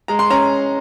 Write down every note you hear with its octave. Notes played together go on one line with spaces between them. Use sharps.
G#3 A#5
C6
C#4 A#5